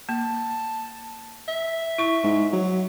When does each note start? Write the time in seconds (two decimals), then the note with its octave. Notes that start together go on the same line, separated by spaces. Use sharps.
0.09 A#3 A5
1.48 E5
1.98 E4 C#6
2.24 G#2
2.53 F#3